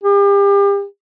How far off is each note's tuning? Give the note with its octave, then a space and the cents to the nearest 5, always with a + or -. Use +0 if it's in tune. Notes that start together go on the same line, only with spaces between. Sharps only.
G4 +35